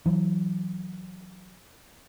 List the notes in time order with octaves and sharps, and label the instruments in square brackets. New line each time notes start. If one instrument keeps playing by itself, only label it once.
[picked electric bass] E3 F#3